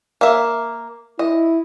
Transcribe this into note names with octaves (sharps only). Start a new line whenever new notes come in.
A#3 E5
E4 D#5